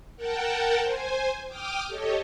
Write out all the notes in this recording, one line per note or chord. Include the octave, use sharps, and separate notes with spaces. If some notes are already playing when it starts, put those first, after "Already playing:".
A#4 F#5 G5 A5
C5 G#5
G5 D6 D#6 F6
G4 A4 C#5 D#5